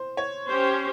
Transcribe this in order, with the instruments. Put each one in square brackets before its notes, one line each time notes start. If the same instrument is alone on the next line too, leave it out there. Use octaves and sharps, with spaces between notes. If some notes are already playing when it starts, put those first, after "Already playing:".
Already playing: [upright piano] C5
C#5
[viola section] C#4 G4 C5